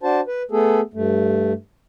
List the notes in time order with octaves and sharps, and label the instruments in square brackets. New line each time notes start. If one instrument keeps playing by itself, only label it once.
[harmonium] D4 F#4 C5 A5
B4
A3 B3 G#4 A4
G2 A3